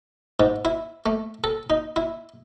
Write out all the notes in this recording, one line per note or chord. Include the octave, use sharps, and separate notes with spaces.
G#2
E4
A3
A4
D#4
E4